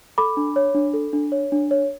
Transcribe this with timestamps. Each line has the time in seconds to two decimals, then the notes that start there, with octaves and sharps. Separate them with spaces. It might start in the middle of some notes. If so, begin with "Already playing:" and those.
0.18 A4 B5 D6
0.37 D4
0.56 C#5
0.75 D4
0.94 A4
1.13 D4
1.32 C#5
1.52 D4
1.71 C#5